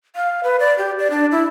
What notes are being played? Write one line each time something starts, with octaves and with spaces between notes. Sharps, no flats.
F5
B4
D5
G4
D5
D4
E4